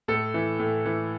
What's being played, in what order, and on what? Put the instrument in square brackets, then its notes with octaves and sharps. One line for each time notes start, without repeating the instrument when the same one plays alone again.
[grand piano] A2 A4
E3
A2
E3